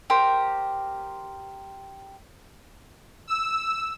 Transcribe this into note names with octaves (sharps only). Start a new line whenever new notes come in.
G4 A#4 C5
E6